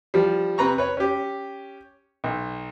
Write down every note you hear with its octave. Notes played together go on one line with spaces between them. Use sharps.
F3 G3
C3 B4 A#5 C#6
B4 C#5
C#4 G4
B1